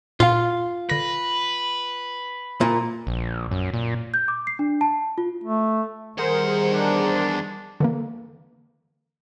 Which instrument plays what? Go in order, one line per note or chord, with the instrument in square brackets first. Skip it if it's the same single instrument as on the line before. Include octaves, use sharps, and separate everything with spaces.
[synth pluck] A#2 F5 [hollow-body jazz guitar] F4
[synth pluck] D3 A#6 [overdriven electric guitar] B4
[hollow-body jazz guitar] A#2
[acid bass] A#1
F#2
A#2
[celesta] G6
D6
C7
D4
A5
F4
[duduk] A3
[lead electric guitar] E2 F#5 [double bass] D#3 G3 [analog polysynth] G#4 A#4 C5
[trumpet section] D4
[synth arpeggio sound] D3 E3 A#3